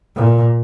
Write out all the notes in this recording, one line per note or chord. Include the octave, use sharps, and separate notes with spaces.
A#2